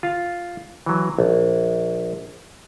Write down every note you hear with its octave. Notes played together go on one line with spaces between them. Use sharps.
F4 F5
E3 F#3
A#1